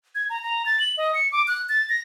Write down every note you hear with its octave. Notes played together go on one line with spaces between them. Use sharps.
G#6
A#5
A#5
A6
F#7
D#5
C#7
D6
F#6
A6
A#6